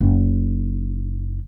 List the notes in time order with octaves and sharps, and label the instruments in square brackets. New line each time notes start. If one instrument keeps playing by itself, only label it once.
[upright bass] F#1 D#4